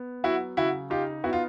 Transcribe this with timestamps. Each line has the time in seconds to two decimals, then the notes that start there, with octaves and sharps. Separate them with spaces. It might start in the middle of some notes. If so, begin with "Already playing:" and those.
Already playing: B3
0.24 F#3 E4 F#4
0.57 C#3 E4 F#4
0.90 D#4 F4 G4
1.24 B3 E4 F#4
1.33 F4